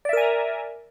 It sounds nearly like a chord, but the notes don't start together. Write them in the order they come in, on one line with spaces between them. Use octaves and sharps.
D5 E5 A#4 G#5 A#5